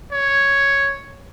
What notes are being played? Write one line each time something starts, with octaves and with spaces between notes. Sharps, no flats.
C#5